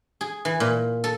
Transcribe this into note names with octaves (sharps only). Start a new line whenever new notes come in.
G#4
E3
A#2
A4